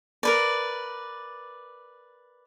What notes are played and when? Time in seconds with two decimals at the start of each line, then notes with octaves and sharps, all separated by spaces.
0.23 A#4 B4 D5